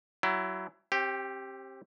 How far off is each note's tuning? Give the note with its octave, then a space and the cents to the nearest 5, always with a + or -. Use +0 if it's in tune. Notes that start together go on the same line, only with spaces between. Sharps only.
F#3 +25 E4 +20
C4 +35 G4 +0